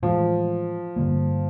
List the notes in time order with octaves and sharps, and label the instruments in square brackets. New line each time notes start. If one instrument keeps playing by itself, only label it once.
[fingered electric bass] A2 E3 G#3 [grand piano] F3
[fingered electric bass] G2 D3 G3 A#3